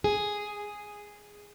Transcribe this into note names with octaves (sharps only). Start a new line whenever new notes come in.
G#4